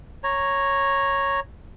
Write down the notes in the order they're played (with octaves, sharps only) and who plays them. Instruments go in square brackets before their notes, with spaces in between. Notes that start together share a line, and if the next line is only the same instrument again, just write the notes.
[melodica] C#5 A#5